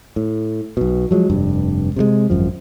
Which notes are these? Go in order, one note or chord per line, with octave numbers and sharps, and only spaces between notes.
A2
B1 B2
F3 F#3 G#3
F1 G2
C3 D#3 G#3
G#1 F#2 F3